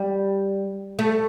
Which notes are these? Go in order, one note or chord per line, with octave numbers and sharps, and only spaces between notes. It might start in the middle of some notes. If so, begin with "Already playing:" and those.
Already playing: G3
A3